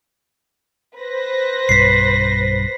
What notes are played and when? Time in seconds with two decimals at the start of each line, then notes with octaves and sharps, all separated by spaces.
0.98 B4 C5 A#6
1.69 B1 G2 B6 C7